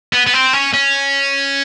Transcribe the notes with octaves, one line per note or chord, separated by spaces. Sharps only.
B3
B3
C4
C#4
C#4